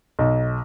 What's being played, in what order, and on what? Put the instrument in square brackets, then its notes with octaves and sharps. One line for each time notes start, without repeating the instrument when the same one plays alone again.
[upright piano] B1